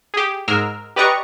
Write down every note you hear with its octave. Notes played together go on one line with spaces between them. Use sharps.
G4 G#4
G#2 G#3 A#4 E6 F6
G4 B4 D5 D#5 A#5 C#6